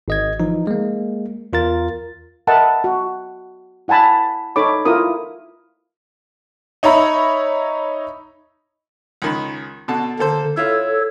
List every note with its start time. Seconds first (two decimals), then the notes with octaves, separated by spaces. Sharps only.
0.08 G#1 D#5 G#6
0.40 E3 F3 D#4
0.67 G#3 A#3
1.53 E2 F4 A#4 A6
2.47 A#4 D#5 E5 F#5 A5 B5
2.84 F#4
3.88 E4 F#5 G#5 A5 B5
4.56 D#4 A4 C#5 B5 D6
4.85 E4 F4 A#4 D#6
6.83 D#4 C#5 E5 A#5 B5
9.22 C#2 D#3 B5
9.88 B2 D3 A5
10.19 D3 A#3 A4 C5
10.57 E4 F4 A4 C#5